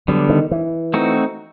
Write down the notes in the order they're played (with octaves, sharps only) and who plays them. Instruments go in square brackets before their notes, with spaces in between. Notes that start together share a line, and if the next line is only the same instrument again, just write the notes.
[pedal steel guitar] D3 G3 B3 [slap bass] F#3
[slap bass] D#3
E3
[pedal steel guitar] A3 C4 D#4 F#4